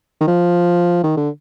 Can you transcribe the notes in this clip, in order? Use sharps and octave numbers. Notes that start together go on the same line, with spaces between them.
D#3
F3
D#3
D3